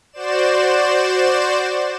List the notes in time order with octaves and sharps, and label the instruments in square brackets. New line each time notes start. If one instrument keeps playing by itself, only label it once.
[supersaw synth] F#4 C5 D5 E7